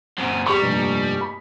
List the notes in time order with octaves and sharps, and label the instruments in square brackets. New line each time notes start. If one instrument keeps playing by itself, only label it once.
[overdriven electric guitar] F#2 A#2 [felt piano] C4 [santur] A#4 E5 A#5
[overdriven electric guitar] G3 [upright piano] G4 C#6 [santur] A#4 A#5
[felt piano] F1 G2 A#2 [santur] D#4 G#5 C6
[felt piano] B5